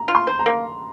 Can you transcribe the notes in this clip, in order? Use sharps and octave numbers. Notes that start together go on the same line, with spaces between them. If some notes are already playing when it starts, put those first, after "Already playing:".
Already playing: A#5
F4
C6
C5
A#5
A#3